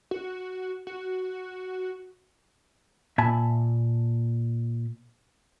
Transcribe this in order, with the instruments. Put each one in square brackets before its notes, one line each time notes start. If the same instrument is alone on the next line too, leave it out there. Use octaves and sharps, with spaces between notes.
[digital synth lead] F#4
F#4
[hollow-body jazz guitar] A#2 E5 G#5 A5 B5